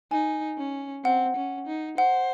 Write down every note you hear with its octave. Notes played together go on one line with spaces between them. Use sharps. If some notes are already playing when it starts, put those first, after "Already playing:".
D#4 G#5
C#4
C4 F#5
C#4
D#4
C5 F#5